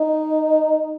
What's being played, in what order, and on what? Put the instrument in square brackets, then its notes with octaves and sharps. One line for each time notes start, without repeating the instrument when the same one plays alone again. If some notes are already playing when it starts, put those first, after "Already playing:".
Already playing: [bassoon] D#4